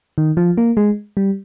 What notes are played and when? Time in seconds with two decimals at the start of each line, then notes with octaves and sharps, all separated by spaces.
0.18 D#3
0.37 F3
0.57 A#3
0.77 G#3
1.17 G3